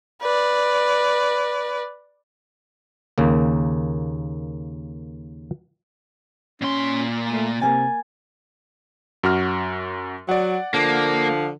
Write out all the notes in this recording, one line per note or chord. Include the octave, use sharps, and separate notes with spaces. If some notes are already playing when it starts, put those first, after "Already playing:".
B4 D5
D#2 C#3 A#3
A#2 C#4 C6
A3 D#7
C3 A#3 G#5 A6
F#2 F#4 F6
F#3 D5 F#5
D3 F3 A#3